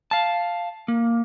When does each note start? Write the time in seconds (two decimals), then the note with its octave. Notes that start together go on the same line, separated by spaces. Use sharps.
0.11 F5 A5
0.88 A#3